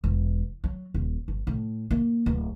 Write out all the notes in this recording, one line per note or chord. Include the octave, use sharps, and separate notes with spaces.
E1
F#3
D#1
G1
A2
A#3
D1